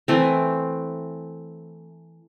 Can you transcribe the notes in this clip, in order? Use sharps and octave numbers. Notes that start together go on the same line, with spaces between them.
E3 A3 C4